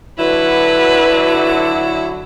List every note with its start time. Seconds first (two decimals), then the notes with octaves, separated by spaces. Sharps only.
0.19 D3 F#3 E4 B4